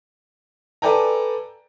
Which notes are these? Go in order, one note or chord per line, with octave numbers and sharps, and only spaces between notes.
A4 B4 D5 G5 G#5 A#5